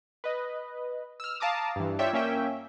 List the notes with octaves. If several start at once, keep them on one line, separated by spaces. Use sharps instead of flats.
B4 D#5
E6 F6
F5 A5 A#5 D6 D#6
G2 E3
F4 C#5 D5 E5 G5
A#3 C#4 E5 G5